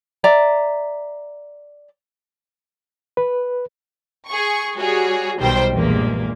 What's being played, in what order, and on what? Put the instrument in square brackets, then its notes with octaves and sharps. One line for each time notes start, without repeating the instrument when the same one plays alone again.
[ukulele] D5 E5 A#5
[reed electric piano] B4
[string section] G#4 C#6
G3 F#4 G#4 C#5
B1 D#3 G3 C5 G5
A#1 E2 G2 A#2 G#3 A#3